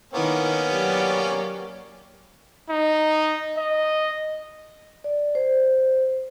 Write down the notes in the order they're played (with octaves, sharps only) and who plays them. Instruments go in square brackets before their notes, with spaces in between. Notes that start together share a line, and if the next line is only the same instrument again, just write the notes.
[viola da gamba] D#3 E4 [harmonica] A#3 B3 C#4
[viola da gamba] F#3 G4 D5
[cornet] D#4
D#5
[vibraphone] D5
C5